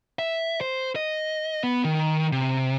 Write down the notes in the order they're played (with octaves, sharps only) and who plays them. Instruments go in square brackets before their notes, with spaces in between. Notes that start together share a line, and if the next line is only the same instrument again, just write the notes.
[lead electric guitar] E5
C5
D#5
B3
D#3
C3